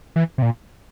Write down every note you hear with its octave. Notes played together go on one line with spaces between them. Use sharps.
E3
C3
A#2